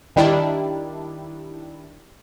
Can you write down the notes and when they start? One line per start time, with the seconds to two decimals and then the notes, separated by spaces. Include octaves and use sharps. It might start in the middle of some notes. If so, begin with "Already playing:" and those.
0.16 D#3 G3 D4 E4